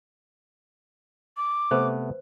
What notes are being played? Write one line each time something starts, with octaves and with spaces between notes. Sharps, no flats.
D6
C3 A3 B3 B4 C5